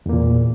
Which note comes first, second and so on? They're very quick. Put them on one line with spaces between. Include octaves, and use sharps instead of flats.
E2 A#3 A#2